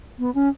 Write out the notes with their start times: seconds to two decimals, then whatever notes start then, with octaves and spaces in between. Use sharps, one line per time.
0.19 B3
0.35 C#4